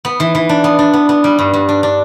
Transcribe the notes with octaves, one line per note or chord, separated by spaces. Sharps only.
B3
E3
E3
D4
B3
D4
B3
B3
G3
G2
G2
D4
D4